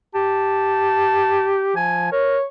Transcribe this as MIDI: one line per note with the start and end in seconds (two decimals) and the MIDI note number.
0.15 1.75 67
0.15 1.60 81
1.76 2.08 53
1.76 2.12 80
2.12 2.38 70
2.12 2.43 73